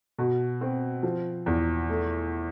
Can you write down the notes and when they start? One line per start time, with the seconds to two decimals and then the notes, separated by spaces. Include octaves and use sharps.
0.18 B2
0.61 C4
1.03 F3
1.46 E2
1.89 A3